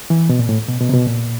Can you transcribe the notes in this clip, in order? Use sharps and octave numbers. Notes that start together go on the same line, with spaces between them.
E3
B2
A#2
A2
B2
B2
C3
B2
A#2